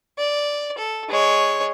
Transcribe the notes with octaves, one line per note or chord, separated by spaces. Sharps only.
D5
A4
G#3 C#5